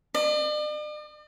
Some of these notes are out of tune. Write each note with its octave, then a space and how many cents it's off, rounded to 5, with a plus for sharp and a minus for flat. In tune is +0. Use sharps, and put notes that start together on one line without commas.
D5 +45